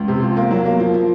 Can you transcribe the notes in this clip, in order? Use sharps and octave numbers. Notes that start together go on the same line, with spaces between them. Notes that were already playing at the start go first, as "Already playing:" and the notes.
Already playing: C#2
C3
F3
A#3
F#3
A#3
F3
F3